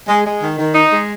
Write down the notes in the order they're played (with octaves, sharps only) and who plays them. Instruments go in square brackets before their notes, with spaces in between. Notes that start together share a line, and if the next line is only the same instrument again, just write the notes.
[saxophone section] G#3
G#3
D#3
D#3
D#4
G#3